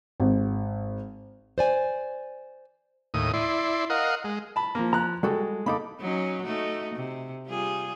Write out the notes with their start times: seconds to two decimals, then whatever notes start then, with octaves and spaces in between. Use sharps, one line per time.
0.20 G#1
1.58 C5 D5 G#5
3.14 D#2 A2 D#6
3.33 E4 D5 C6
3.90 A#4 D#5 F5 F#5
4.24 G#3
4.56 A5 B5
4.75 F3 A#3
4.93 F3 A#5 F#6
5.23 G3 G#3 F#4 A4
5.66 A#3 D#4 A4 B5 D6
6.00 F#3 C#4 D#4
6.42 A3 D#4 F#4
6.95 C3
7.47 G3 F4 G#4